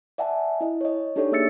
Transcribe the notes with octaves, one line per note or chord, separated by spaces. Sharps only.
D5 E5 F#5 G#5 A5
E4 D#5
C#5 D#5
D4 D#4 G4 A4 C#5 D5
A#3 G#4 E5 E6 A6 C#7